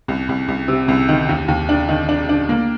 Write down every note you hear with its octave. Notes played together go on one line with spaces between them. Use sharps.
C2
C2
C2
C3
C2
D#3
D#2
D#2
D4
D#3
D4
D4
A#3